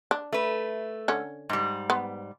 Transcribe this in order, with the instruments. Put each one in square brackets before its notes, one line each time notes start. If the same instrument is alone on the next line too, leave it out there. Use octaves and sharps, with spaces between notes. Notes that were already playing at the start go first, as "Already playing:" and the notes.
[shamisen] D4
[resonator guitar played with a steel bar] A3 B4
[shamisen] D3 C#4
[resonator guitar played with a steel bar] G#2 G3
[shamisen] B3